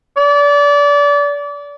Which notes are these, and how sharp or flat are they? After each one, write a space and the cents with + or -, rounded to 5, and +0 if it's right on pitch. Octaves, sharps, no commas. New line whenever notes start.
D5 -30